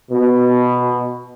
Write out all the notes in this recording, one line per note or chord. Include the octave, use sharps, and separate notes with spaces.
B2